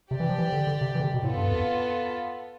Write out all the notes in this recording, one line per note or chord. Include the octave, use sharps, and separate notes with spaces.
C3 G4 D5 G5
E3
F3
E3
D3
D3
C3
E3
D3
C3
B2
A2 B3 F4 A4
G2
F2